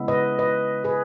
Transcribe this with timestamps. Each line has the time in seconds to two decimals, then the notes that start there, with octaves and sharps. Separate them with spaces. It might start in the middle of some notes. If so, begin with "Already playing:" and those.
Already playing: C#3 G#3 B3 E4
0.08 B4 D#5
0.39 B4 D#5
0.84 G#4 B4